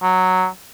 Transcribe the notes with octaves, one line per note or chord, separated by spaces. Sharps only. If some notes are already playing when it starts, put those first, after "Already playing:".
F#3